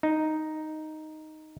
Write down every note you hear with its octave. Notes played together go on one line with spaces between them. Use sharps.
D#4